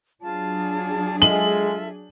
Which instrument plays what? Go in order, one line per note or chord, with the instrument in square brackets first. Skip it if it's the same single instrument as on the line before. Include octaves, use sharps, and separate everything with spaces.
[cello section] F#3 D4 G#4 [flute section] F4 A5
[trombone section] G#3 [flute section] F4 A4 E5 [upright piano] F#7